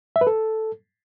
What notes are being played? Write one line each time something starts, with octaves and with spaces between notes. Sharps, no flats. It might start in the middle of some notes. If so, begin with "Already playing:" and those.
E5
B4
A4